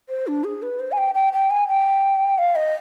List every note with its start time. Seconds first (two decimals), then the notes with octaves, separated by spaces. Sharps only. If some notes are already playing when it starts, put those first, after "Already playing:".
0.09 C5
0.27 D4
0.44 G#4
0.62 B4
0.80 C5
0.92 G#5
0.98 G5
1.15 G5
1.33 G5
1.50 G#5
1.68 G5
2.38 F5
2.56 D#5